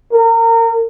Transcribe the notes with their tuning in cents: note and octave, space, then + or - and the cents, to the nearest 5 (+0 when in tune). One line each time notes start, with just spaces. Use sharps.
A#4 -30